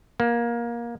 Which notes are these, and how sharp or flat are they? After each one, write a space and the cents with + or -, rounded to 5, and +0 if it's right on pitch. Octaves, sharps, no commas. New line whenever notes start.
A#3 +20